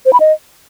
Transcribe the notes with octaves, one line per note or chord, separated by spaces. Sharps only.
C5
B5
D#5